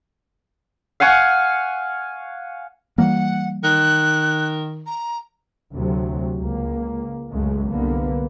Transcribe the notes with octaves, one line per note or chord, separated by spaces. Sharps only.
F5 F#5 G#5 C#6
E3 G3 A#3 F#5
D#3 F#6
A#5
D2 C3 F#3
C#2 A#3
C#2 F#2 C#3 G#3 A3
C2 D3 A#3 B3